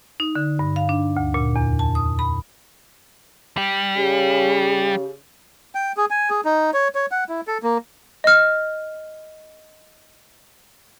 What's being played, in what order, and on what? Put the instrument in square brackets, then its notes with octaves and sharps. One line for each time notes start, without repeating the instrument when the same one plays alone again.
[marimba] D#4
D3
G2
F5
D4
D2
A#2
E2
A5
D#6
B5
[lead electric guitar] G3
[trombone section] C#3 [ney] G4
[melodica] G5
G#4
G#5
G#4
D#4
C#5
C#5
F#5
E4
A4
A#3
[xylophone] D#5 F6